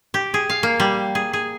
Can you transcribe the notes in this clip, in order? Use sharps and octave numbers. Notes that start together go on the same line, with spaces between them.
G4
G#4
F5
A#3
G3
G#4
G#4